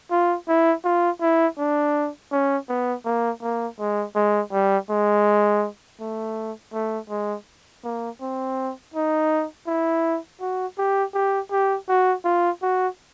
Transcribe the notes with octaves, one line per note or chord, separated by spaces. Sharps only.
F4
E4
F4
E4
D4
C#4
B3
A#3
A#3
G#3
G#3
G3
G#3
A3
A3
G#3
A#3
C4
D#4
E4
F#4
G4
G4
G4
F#4
F4
F#4